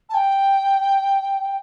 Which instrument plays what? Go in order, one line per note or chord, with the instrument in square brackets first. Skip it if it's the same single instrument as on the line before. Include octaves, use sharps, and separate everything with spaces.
[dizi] A5
G5